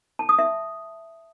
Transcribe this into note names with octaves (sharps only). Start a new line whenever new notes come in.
A5
D#6
E5